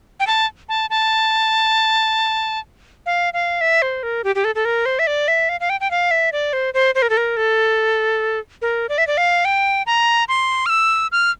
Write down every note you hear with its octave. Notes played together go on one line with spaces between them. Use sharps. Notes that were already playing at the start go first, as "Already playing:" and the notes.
G5
A5
A5
A5
F5
F5
E5
C5
A#4
G4
G4
A4
A4
A#4
C5
E5
D5
E5
F5
F5
G5
G5
F5
E5
D5
C5
C5
C5
A#4
A4
A#4
A4
A#4
D5
E5
D5
F5
G5
A#5
C6
F6
E6
F6